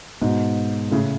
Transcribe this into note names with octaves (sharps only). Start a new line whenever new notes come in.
G#2 B2
A2 C#3